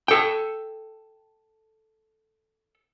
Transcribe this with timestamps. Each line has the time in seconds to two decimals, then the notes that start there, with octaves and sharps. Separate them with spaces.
0.08 A4 G5